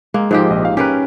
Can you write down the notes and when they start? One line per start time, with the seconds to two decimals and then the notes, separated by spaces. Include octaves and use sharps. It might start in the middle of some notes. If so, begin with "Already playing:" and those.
0.14 G#3 A#3
0.31 G#2 F3 G#3 A#3 G4
0.50 A#1 D#5
0.65 F5
0.77 C#4 G4 A#4 B4